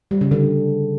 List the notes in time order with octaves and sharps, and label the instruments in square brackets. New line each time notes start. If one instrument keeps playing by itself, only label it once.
[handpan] G3
C#3
D3